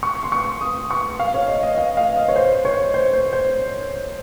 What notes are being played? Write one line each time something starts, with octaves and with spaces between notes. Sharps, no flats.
C#6
C6
C#6
D#6
C#6
F5
C#5
D#5
D#5
F5
F5
D#5
C#5
C5
C#5
C5
C5
C5